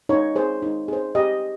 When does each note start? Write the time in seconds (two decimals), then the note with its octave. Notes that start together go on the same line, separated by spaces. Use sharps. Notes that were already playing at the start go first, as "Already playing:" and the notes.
0.09 D#4 C#5
0.36 G#4 C5
0.62 D#4
0.88 G#4 C5
1.15 G4 D#5